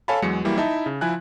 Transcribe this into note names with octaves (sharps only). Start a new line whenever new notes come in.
A4 C#5 F5 G#5 A5 B5
E2 F#3 G#3 C#7
E3 F#3 G3 A#3 E4
D#4 E4 E5 A5
C#3
F3 E4 G#5 F#6